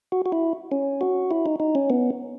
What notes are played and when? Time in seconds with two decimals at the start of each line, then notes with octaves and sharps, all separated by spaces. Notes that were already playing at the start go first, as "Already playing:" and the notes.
0.12 F#4
0.26 F#4
0.32 E4
0.72 C#4
1.01 F#4
1.31 E4
1.46 D#4
1.60 D#4
1.75 C#4
1.90 B3